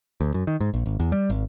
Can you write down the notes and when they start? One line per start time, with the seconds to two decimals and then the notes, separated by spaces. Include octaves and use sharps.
0.21 D2
0.34 F#2
0.47 D#3
0.60 G#2
0.74 A#1
0.86 G#1
1.00 E2
1.12 G3
1.30 G#1